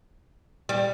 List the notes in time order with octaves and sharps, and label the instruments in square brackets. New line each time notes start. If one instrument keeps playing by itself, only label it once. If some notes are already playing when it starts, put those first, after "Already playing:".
[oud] G3